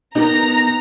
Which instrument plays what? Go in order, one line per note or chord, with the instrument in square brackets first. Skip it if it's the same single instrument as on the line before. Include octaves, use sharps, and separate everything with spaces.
[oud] B3 G4 A#4 [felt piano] D#4 [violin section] A#5